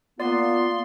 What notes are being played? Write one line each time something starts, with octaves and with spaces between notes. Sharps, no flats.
A#3 B3 F4 D5 C6